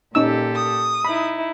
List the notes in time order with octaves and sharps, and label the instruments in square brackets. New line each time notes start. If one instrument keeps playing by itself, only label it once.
[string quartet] A#2 G4 A4 [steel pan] C#4 D#4 E6
[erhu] D#6
[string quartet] D#4 E4 [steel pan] B5